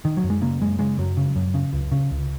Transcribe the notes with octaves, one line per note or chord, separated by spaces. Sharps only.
D#3
F#3
F#2
G#3
C#3 A#3
F#2 G#3
C#3 G#3
F#2 F#3
C#3
F#2
C#3
C#2
C#3
C#2